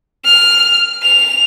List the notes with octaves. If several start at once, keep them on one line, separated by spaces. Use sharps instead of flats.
F6
F7